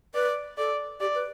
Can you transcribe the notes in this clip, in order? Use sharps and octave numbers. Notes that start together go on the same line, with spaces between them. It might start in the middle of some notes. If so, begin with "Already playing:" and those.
B4 D5
A4 D5
G4 D5
B4